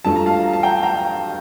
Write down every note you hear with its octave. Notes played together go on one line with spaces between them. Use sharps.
G2 F3 A3 A5
A#5
F5 A5
A#5
A5
G5 A#5
G5 A#5